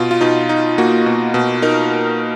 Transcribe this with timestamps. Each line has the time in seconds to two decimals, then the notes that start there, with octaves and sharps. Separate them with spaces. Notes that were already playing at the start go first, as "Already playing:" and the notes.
Already playing: B2 F4
0.11 F4
0.21 B2 D#4
0.49 D#4
0.78 A#3 F#4
1.06 B2
1.34 B2
1.62 D#4 A#4